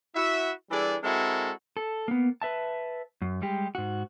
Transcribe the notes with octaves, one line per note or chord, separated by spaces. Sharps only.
E4 F#4 E5
E3 G3 D4 G#4 A4 D5
G#3 C4 E4 F#4 A4 A#4
A4
A#3 B3
B4 E5 A5
F#2
G3 G#3 G4
G#2 F#4